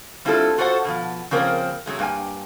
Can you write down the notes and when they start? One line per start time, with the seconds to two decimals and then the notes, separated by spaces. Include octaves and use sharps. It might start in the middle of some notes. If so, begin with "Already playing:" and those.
0.25 G3 C4 E4 F4 G#4 A4
0.58 F4 F#4 A4 A#4 C5 F#5
0.85 B2 E3 F3
1.31 C#3 F3 A#3 C4 A#4
1.86 C3 F#3 G#3 A3
1.99 G2 A#3 G5 G#5